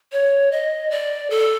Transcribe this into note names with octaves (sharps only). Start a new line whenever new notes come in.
C#5
D#5
D5
A4